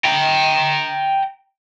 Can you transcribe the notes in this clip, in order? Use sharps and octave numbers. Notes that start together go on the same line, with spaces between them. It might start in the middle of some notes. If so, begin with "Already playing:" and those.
G5 A#5